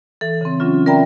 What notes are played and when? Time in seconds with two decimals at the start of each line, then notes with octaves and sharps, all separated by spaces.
0.21 E3 A4
0.41 C#3 C4
0.60 F#3 C#4 F4
0.86 A#4 D5 E5 G5 A#5 B5